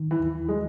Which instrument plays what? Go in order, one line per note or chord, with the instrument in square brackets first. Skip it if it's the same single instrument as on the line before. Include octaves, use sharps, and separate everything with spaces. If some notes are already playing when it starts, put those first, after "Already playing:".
Already playing: [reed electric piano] D#3
[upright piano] E3
[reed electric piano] D#2
[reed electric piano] F#3 [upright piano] G#3